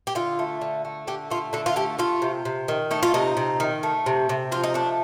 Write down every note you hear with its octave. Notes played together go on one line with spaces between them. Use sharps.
G4
D3 F4
A3
D3
A3
D3 G4
A3 F4
D3 A4
F4
A3 G4
A3 F4
C3
C3
D#3
A3 D#4
F4
C3 D#4
C3
D#3
A3
C3
C3
F3 F4
D#4
A3 D4